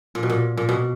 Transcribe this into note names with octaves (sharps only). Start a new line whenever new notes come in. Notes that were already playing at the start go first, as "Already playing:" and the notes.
A#2
B2
A#2
A#2
B2